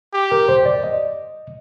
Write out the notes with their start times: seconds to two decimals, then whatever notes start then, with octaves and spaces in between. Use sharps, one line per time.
0.14 G4
0.32 A#4
0.49 C5
0.66 D5
0.84 D#5